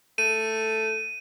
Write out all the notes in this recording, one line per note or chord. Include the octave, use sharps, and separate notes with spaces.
A3 D#7